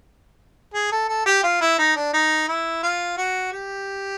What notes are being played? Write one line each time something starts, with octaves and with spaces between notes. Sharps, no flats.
G#4
A4
A4
G4
F4
E4
D#4
D4
D#4
E4
F4
F#4
G4